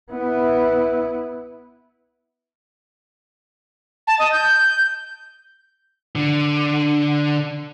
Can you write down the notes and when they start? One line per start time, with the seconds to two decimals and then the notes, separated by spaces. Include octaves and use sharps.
0.12 B3 E4
4.07 A5
4.19 D#5
4.32 G6
6.15 D3